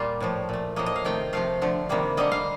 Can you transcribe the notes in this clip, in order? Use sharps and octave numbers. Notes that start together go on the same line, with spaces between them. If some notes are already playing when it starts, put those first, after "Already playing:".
Already playing: A#2 G3 A#3 F4
A2 F3 A3
A#2 A3
A2 F3 A#3 D#5
D#5
F5
C3 D#3 A3 G5
C3 F3 A3 F5
D3 F3 A3
C3 D#3 G3 A#3
D3 G3 A#3 D#5
F5